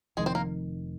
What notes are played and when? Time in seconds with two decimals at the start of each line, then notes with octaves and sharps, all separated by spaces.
0.17 F1 F2 D#3 G#3 G#4
0.26 C4 C5
0.35 A#3 A#4